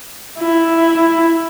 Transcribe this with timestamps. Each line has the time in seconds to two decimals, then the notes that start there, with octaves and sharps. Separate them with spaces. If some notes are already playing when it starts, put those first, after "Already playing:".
0.39 E4